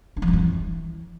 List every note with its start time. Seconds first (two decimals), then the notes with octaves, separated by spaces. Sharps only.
0.17 D4
0.22 F3
0.28 G#3
0.33 F#3
0.39 E3